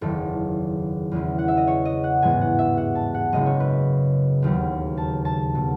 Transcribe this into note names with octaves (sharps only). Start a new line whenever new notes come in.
F#1 E2 D#3 A4
E2 C#3 G#3 C#4 E4
F#5
E5
D#5
C#5
D#5
F#5
A1 G#2 E3 G#3 B3 G#5
F#5
E5
F#5
A5
F#5
F#1 F#2 C#3 G#3 D#5
C#5
B4
E1 D#2 C#3 F#3 C#4
A5
A5
B2 F#3